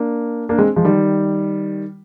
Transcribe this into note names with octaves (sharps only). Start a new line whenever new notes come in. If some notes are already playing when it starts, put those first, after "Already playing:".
Already playing: A#3 D4
A#3 D4
G#3 C4
F3 G#3
D#3 G3